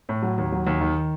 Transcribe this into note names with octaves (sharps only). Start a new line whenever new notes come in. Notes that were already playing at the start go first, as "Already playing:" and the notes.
A2
F#3
D#2
F#3
D#2
D#3